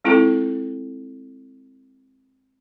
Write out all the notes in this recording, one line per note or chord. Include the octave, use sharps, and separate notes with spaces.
G#3 C4 E4 F4 A4 G5